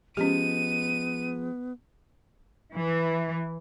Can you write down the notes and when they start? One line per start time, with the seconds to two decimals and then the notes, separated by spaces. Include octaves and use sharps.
0.17 F3 G#3 B3 C#4 G4 D#7
2.74 E3